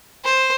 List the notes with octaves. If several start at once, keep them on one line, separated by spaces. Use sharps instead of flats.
C5